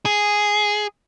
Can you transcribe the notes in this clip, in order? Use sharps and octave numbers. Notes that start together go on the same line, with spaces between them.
G#4